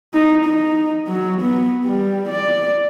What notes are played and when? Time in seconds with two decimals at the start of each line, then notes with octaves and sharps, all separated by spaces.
0.14 D#4
0.45 D#4
1.07 F#3
1.41 B3
1.85 G3
2.29 D5